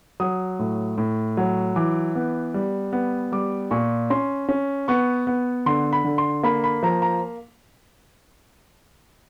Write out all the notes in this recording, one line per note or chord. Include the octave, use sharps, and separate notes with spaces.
F#3 D#6
A2
A2
F#3
E3 D6
B3
G3
B3
G3 D6
A#2 C#6
C#4 C6
C#4
B3 C#6
B3
D3 C6
B5
D3
C6
A#3 B5
B5
F3 A#5
A#5